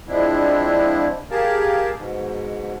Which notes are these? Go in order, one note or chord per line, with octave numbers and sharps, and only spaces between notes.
F3 G#3 C4 D4 E4
G4 G#4 A#4 F5 A5
G#2 B2